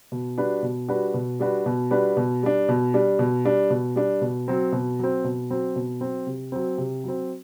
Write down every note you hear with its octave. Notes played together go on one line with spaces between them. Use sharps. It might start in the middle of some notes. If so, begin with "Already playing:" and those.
B2
G3 D4 F#4 B4
B2
G3 D4 F#4 B4
B2
G3 D4 F#4 B4
B2
G3 D4 F#4 B4
B2
G3 D4
B2
G3 D4
B2
G3 D4
B2
G3 D4
B2
F#3 C4
B2
F#3 C4
B2
F#3 C4
B2
F#3 C4
C3
F#3 C4
C3
F#3 C4